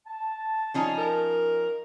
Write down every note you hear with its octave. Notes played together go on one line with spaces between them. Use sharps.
A5
F3 C#4 D#4
A#4